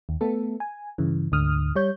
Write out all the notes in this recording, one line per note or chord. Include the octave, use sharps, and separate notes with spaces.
D#2
A3 B3 A4
G#5
G2 C#3 E3
D2 G#2 D3 D#6 F6
G3 C#5 G6